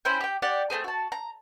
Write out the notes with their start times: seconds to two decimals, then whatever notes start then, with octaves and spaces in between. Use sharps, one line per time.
0.05 C#4 E4 C5 G5
0.20 G4 G5
0.42 G4 D5 F#5
0.70 A3 A#3 C4 G#4
0.84 F#4 A5
1.12 A#5